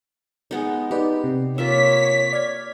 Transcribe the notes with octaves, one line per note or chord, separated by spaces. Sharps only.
G#3 B3 D#4
D#4 G4 B4 D5
C3
A#3 F4 C#5 E5 B6
D5 F6 G#6